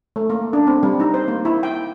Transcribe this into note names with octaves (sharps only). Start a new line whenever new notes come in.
A3
A#3
D4
C4
G3
D#4
C5
A#3
E4
G5